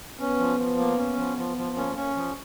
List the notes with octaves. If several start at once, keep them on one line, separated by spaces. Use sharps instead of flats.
B3 C#4
F3
F3
A#3
C#4
F3
F3
F3
A#3 C#4
C#4
F3